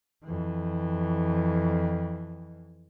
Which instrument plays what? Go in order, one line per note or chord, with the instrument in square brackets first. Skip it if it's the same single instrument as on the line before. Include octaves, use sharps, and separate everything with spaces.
[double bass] F2 E3